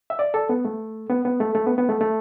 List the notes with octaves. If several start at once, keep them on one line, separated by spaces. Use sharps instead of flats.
E5
D5
A4
B3
A3
B3
B3
A3
A3
B3
B3
A3
A3